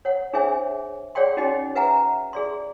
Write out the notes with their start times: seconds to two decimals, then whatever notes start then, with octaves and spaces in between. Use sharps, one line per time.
0.05 C#5 F#5
0.33 D4 G#4 C5 C#5 E5 G#5
1.15 G#4 C#5 D5 F#5 G5 C6
1.37 C#4 D#4 F#4 G#4 D#5 G5
1.75 B4 E5 F#5 G#5 A#5
2.33 G#4 D5 C6